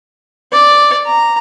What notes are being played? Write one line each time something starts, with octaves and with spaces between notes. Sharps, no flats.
D5
A#5